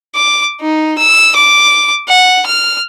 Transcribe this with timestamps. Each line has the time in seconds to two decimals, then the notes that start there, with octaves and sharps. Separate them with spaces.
0.15 D6
0.61 D#4
0.98 E6
1.36 D6
2.08 F#5
2.46 F6